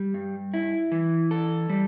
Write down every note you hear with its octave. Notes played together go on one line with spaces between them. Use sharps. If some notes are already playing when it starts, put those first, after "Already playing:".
Already playing: G3
G2
E4
E3
A4
G3